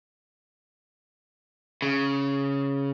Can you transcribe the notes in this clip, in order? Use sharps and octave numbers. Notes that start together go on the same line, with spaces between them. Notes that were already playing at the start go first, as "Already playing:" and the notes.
C#3